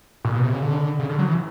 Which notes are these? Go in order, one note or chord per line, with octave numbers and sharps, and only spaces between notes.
A#2
B2
C3
C#3
D3
C#3
D3
F#3
E3